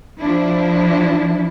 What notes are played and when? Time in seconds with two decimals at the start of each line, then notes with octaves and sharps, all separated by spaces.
0.19 F3 D4 E4